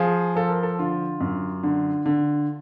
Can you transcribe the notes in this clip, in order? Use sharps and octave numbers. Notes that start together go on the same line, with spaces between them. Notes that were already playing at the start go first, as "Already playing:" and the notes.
Already playing: F3 G#4
F3 A4
A#4
A4
D3 F4
F#2
D3
D3